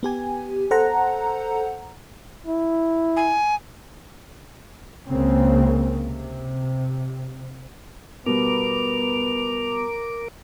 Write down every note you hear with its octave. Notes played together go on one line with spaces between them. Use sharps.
B3 G4 G#5
A4 C5 F#5 A#5
E4
G#5
C#2 C#3 A#3 C4
C3
B2 G3 B3 A#4 D6 F7